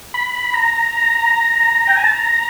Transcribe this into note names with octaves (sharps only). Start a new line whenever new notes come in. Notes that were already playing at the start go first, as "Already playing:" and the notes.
B5
A#5
G5
G#5
A5
A#5